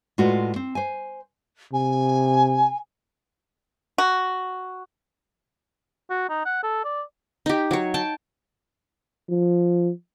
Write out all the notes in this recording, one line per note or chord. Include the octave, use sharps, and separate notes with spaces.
A2 G#3 F4 F#4 B4 D5
C4
C5 G#5
C3 G#5
F#4
F#4
D#4
F#5
A4
D5
D#4 G4
F#3 C#5
G5 A5
F3